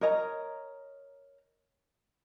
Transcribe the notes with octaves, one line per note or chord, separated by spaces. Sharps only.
A#4 C#5 D#5 A#5